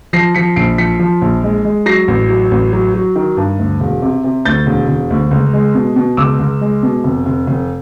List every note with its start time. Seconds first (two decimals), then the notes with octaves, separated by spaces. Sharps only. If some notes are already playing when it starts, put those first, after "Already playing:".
0.13 F3 A#6 C7
0.35 F3 B6 C#7
0.56 A#1 C7 D7
0.78 F3 B6 C#7
0.99 F3
1.22 A#1
1.44 G#3
1.65 G#3
1.86 F#3 A#6 C7
2.08 A1
2.29 F#3
2.51 A1
2.73 F#3
2.94 F#3
3.16 D#3
3.37 G2
3.59 D2
3.80 E1
4.02 C3
4.24 C3
4.45 D2 G6 A6
4.67 E1
4.88 E1
5.10 D2
5.31 C#2
5.53 G#3
5.75 B2
5.96 B2
6.17 C#2 D6 E6
6.39 C#2
6.61 G#3
6.83 B2
7.04 F1
7.26 F1
7.47 F1